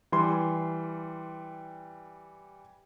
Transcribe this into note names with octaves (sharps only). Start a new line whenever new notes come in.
E3 G3 C6